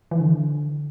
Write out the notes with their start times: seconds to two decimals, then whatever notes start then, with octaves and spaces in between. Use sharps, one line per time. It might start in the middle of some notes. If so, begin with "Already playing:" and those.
0.11 E3
0.20 D3